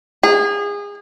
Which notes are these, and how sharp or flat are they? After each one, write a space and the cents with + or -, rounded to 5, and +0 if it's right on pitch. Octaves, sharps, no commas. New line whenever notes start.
G#4 -30